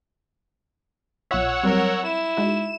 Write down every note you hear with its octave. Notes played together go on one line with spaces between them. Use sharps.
B1 F4 C#5 E5 F#5 E6
F#3 G3 C4 A#4
E4 E7
G#3 D#4 F#4